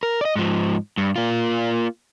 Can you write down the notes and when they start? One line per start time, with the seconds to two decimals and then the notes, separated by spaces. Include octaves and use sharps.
0.03 A#4
0.21 D5 D#5
0.36 G#2 F3
0.98 G2
1.16 A#3 F4